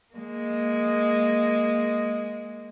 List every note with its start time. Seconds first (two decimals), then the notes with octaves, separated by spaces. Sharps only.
0.14 G#3 A#3